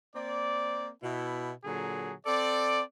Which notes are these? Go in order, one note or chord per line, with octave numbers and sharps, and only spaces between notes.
A#3 C4 D5
B2 E4
A#2 D3 F#3 G#4
C4 A4 D5